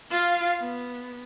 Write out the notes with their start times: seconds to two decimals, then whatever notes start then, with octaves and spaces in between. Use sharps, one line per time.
0.11 F4 F5
0.61 B3